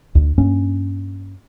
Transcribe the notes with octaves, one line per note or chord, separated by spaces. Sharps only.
D2
G2 A#3 C#4